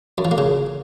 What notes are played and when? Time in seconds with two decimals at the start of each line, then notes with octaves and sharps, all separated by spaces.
0.18 F#2
0.25 F3
0.31 A#3
0.38 C#3